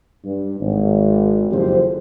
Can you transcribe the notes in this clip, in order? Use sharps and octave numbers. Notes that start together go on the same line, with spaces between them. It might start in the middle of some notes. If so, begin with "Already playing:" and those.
G2
G#1
F#1 F2 G4 C5